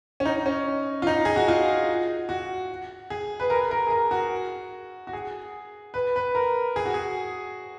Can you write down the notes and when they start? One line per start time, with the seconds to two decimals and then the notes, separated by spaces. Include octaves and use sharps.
0.20 C#4
0.25 D#4
0.46 C#4
1.02 F4
1.07 D#4
1.25 G#4
1.36 F#4
1.48 F4
2.29 F#4
3.10 G#4
3.40 B4
3.50 A#4
3.71 A#4
3.87 G#4
3.91 A#4
4.11 F#4
5.07 F#4
5.13 G#4
5.94 B4
6.16 B4
6.35 A#4
6.76 G#4
6.85 F#4
6.94 G#4